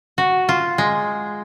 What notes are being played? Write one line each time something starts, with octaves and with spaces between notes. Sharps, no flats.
F#4
F4
G#3